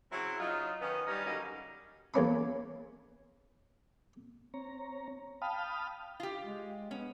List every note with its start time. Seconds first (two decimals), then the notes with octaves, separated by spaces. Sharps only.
0.12 C#3 F#3 C4 C#4 E4
0.39 F#3 D#4 F4
0.81 D#3 B3 C#4
1.07 G3 C#4 D#4
1.26 D3 F#3 G3 A#3 C#4 D#4
2.14 E2 A#3 C#4 B5
4.54 C4 C#5 A#5
5.42 F5 G5 A5 B5 D#6 F6
6.20 F4 G4
6.44 G#3
6.91 B3 C#4